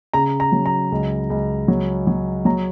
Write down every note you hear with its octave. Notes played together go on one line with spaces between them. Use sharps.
C#3 A#5
A#5
F#3
A#5
C#2
C#2
F#3
F#3
F#3 A#5